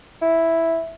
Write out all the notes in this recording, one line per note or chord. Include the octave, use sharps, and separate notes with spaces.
E4